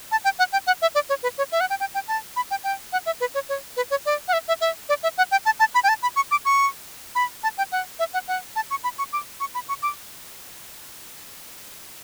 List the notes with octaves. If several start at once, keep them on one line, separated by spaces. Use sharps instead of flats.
A5
G5
F#5
G5
F#5
E5
D5
C#5
B4
C#5
E5
F#5
G5
G5
G5
A5
B5
G5
G5
F#5
E5
B4
C#5
C#5
B4
C#5
D5
F#5
E5
E5
E5
D5
E5
F#5
G5
A5
A5
B5
G5
A5
B5
C#6
D6
C#6
B5
A5
G5
F#5
E5
F#5
F#5
A5
C#6
B5
C#6
D6
C#6
B5
C#6
D6